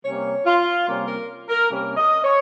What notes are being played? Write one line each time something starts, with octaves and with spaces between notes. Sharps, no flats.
C3 G3 A#3 C#4 C#5
F4
C3 G3 A#3 C#4 F4
A#4
A#4
C3 G3 A#3 C#4
D#5
C#5